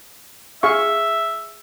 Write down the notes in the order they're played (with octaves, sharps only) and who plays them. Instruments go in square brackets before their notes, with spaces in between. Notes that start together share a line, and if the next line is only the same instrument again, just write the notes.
[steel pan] G#4 F5 C#6 [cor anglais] E5